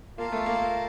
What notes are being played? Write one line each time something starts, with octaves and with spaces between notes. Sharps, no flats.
A#3 F4 A#4 F5 A5
A3
A#3